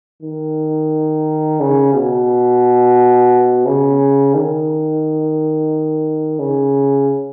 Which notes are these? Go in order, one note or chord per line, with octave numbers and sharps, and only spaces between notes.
D#3
C#3
B2
C#3
D#3
C#3